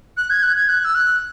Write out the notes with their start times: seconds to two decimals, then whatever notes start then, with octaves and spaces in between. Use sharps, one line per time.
0.17 F#6
0.30 G#6
0.43 F#6
0.56 G#6
0.69 F#6
0.85 E6
0.95 F#6